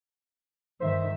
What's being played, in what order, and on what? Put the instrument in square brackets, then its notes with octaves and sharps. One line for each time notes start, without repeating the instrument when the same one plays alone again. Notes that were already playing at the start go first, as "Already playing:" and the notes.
[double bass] G2 D#3 [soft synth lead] C5 [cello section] E5